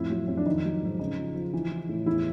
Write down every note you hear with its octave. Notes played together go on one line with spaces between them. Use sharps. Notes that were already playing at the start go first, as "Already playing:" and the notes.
Already playing: F2 A2 E4
F#3
F2
D4
D#3 D#4
F#3
G#2
C#3 D#4
F3
F3
E3
E3
A2
E2 E4